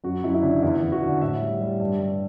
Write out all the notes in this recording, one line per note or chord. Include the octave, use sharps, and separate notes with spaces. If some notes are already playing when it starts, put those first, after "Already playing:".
F#2 F#4
F#2 E4
E4
C#3 D4
E2 E4
E2
F#4
D3
A2 E5
G3
G3
G2
G2